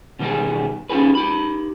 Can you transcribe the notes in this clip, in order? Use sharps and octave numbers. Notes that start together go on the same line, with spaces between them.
B2 D#3 G3 B3 G4 G#4
C#4 D#4 F4 G4 G#4 B4
D#4 G4 B5